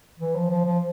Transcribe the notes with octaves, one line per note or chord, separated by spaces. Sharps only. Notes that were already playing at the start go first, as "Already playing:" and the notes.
E3
F3
F3
F3